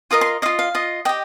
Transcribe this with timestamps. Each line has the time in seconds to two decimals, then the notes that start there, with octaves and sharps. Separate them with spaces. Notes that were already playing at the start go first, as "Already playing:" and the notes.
0.11 F4 A#4 D#5 D#6
0.21 C6
0.42 D#5 F5
0.46 F4
0.59 F5
0.75 F4 D#5
1.05 G4 D#5 G5